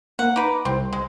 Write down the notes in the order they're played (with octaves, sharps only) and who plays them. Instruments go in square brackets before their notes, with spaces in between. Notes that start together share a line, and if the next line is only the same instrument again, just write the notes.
[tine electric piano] A#3 [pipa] F#5
[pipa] D#4 B4 [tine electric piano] D6
[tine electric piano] C2 [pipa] C4
[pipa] G#3